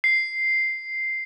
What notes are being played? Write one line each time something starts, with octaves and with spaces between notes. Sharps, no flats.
C7